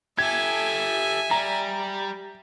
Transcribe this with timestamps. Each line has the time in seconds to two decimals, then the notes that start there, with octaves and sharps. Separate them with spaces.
0.18 G4 A4 E5 G#5 G#6
1.31 G3 A#5